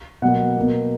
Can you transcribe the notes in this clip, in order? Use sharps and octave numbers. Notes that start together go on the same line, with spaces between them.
B2 F#3 A#3 F#5
B2 A#3